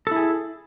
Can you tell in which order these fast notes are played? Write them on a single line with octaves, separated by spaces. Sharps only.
A4 E4 G#4